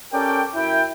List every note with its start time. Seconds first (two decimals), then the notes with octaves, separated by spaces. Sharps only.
0.13 C#4 G4 A4 A#4 D5 G5
0.55 F#2 E4 G5